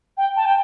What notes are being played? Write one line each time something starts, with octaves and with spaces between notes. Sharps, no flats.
G5
A5
G5